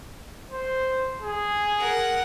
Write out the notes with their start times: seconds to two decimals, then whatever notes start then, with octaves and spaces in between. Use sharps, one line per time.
0.52 C5
1.22 G#4
1.78 A#4 F#5